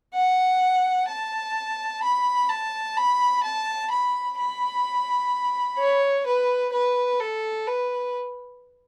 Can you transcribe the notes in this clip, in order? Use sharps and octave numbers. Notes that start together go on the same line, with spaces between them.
F#5
A5
B5
A5
B5
A5
B5
B5
C#5
B4
B4
A4
B4